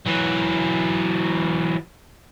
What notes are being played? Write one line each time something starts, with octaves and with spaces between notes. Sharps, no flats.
E3 F#3